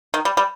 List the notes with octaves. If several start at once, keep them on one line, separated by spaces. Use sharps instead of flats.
D#3
G3
G3